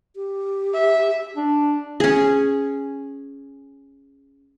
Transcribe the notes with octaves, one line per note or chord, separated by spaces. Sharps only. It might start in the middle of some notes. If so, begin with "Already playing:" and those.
G4
E5
D4
C#4 G#4